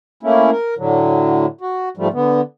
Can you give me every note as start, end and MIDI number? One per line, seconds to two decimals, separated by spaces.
0.23 0.50 57
0.23 0.50 58
0.23 0.50 61
0.23 0.50 64
0.51 0.74 70
0.78 1.46 45
0.78 1.46 50
0.78 1.46 54
1.61 1.89 66
1.97 2.08 44
1.97 2.08 53
1.97 2.08 55
1.97 2.08 57
2.13 2.41 50
2.13 2.41 59